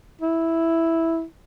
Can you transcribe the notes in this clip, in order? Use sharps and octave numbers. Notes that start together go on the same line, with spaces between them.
E4